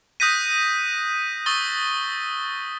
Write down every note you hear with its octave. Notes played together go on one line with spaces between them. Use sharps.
D#6 F#6 G6 A#6 B6 D#7
C#6 D#6 E6 A6 G7